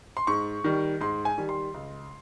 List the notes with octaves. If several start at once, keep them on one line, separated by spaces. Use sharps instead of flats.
C6
G#2 C#6
D#3 G3
G#2 C6
G#5
D#3 G3
C6
C#2